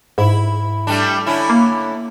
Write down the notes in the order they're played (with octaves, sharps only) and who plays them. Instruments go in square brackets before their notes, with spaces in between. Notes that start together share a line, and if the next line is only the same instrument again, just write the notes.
[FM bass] G#2 [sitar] E4
[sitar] G3 A3 D4
D3 C#4 E4
[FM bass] A#3